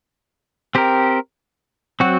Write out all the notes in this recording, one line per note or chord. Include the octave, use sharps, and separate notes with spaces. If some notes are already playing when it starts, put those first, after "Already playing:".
C4 G4 A#4
F#3 C4 F#4